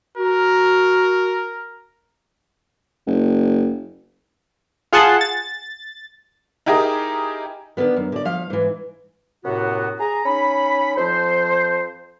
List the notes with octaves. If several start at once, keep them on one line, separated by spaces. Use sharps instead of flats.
F#4 A#4
F#1
F4 G#4 F#5 G#5 A5 C6
A6
D#4 E4 G4 G#4 A#4 D#5
D3 D#3 F3 B3
F#2
D3 D5
F3 F5
G#2 E3
F#2 A2 C3 B3 F#4
G#4 A#5
C#4 D#4 B5
F2 F3 C5